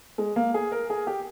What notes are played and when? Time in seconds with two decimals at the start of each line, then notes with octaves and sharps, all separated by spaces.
0.18 G#3
0.36 A#3
0.54 G#4
0.72 A#4
0.90 G#4
1.07 G4